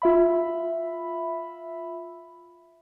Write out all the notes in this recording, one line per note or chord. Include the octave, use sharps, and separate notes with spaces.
F4 E5 B5